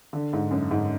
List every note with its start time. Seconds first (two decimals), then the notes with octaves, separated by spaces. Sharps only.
0.13 D3
0.33 G#2
0.51 F#2
0.71 G#2